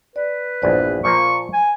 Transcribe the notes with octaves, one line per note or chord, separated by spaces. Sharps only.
B4 D5
A#1 E2 G2 C5 D5
A#2 F3 A#3 C#6
G#5